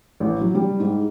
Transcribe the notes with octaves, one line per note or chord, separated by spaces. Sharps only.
A1
F#3
G3
G#2